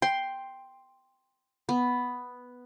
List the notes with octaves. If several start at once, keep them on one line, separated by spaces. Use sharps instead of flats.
G5 C6
B3